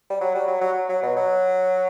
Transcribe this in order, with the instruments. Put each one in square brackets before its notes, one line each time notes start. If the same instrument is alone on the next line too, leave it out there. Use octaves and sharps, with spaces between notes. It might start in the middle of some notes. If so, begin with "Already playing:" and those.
[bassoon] G3
F#3
G3
F#3
F#3
F#3
B2
F#3